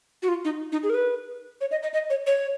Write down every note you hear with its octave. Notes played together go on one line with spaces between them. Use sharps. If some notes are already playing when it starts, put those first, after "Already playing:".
F#4
F4
D#4
D#4
G#4
A#4
B4
C#5
D#5
D#5
D#5
C#5
C#5